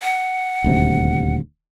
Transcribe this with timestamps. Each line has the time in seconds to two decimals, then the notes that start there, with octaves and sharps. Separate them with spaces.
0.02 F#5
0.64 D#1 D2 C3